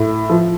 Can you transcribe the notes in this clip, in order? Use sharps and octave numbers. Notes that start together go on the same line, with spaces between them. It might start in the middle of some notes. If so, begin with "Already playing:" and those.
Already playing: A2
F3